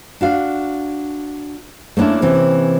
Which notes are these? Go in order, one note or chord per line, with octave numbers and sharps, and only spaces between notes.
D4 F#4 F5
A3 A#3 C#4 D4 E4
C3 E3 A#3 C4 C#4